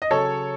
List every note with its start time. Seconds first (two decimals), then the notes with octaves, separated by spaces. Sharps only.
0.02 D#5
0.10 C#3 F#3 A4 C#5